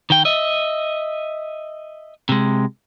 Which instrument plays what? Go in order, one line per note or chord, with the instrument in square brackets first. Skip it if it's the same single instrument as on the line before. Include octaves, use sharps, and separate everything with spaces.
[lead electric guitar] D#3 G5
D#5 E5
C3 G#3